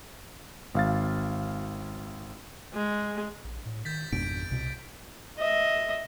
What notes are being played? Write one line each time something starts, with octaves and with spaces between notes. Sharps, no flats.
G#1 F5 A6
G#3
A#1
A2
D#3 G6 A6 B6
G#1 F2 B2 D4 D7
C2 B2
D#5 E5